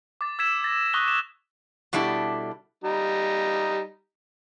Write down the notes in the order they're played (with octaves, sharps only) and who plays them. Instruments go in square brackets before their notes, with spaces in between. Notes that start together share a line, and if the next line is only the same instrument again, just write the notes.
[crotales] D6 A6
E6 G#6 B6 E7
A6 A#6
C#6 D#6 F#6 A#6 E7 G7
E7
[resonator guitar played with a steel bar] B2 G3 D4 E4 G4 A4
[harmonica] G3 D#4